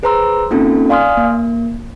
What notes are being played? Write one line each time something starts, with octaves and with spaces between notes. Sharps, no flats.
G#4 B4 C5 A#5 C6 E6
A#3 C4 C#4 D#4 F4 A4
D5 F5 G#5 C6 D#6 F6
A#3